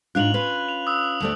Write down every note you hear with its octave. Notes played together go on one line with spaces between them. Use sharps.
G#2 D4 F4 F#6 F7 F#7
C#4 F4 B4
F7
D#6 E6
D2 A3 D5